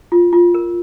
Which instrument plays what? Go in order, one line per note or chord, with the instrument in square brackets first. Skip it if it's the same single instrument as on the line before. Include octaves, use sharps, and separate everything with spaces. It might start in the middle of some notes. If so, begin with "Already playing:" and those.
[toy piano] F4
F4
A#4